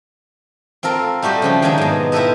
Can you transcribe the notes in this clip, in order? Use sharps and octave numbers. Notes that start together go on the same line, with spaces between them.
C4 F4 A4 A#4
G3 A3 F#4 G4 D#5
C#3 F3 G4
D#3 F#3 G#3 A#3 D4 D#4
G#2 B2
E4 F4 G4 A4 B4 D#5